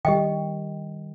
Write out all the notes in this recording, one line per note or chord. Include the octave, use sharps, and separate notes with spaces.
D#3 G3 G4 D#5 G5